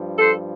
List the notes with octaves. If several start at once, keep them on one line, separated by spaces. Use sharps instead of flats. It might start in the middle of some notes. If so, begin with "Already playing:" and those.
Already playing: G2 F3
A4 C5